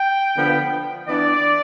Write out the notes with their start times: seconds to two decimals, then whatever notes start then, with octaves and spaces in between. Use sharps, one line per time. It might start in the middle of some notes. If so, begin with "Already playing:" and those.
Already playing: G5
0.35 D3 F3 B3
1.07 E3 B3 D4 D5